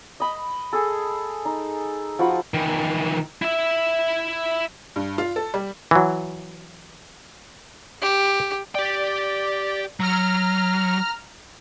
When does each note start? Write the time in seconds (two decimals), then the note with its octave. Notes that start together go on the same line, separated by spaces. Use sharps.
0.20 D#5 B5
0.73 G#4 A4
1.45 D#4
2.19 F3 F#4 B5
2.54 D#3 E3
3.42 E4 E5
4.96 G2
5.18 F4
5.36 A4
5.54 G3
5.91 E3 F#3
8.02 G4
8.75 G4 D5 G5
10.00 F#3 A#5 F6